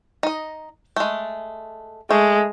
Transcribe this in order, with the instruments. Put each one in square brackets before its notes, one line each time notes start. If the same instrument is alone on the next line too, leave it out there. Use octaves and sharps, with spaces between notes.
[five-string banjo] D#4 D#5
G#3 A3
[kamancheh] G#3 [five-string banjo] A3